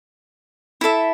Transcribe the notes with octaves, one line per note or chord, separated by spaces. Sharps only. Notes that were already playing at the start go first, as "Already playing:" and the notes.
E4 A4 E5